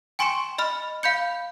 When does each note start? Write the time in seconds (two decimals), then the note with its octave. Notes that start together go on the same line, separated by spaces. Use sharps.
0.19 G5 G#5 C6 C#6 C#7 E7
0.58 D#5 B5 F6
1.03 F5 B5 G6 C#7